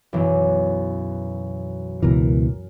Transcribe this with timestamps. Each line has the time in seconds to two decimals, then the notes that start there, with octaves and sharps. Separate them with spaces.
0.13 B1 F#2 E3
2.03 C#2 B2 E3 A#4